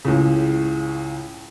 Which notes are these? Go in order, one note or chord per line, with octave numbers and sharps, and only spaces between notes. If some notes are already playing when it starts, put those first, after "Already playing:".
C#2 A2 C#3